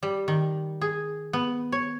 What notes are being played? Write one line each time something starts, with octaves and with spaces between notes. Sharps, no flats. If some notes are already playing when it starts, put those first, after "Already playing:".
G3
D#3
G#4
B3
C#5